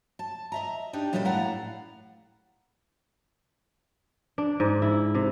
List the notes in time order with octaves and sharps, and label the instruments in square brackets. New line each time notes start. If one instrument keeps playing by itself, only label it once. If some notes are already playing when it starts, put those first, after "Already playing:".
[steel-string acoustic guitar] A5
D#5 E5 A#5
D4 D#4 G4
A#2 G3 C#4 E4 G#4 A4
A2 E4 D5 F5 F#5 A#5
[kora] D4
G#2
E4
C3